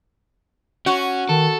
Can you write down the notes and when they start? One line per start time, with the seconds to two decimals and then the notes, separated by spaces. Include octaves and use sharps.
0.86 C#4 F#4 C#6
1.29 D#3 A4 A5